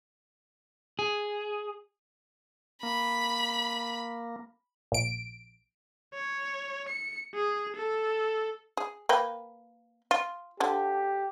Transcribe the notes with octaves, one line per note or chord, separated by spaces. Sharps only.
G#4
A#3 B5
A#1 D7
C#5
C#7
G#4
A4
G#4
A#3 B4 G5
F4
D3 F3 G4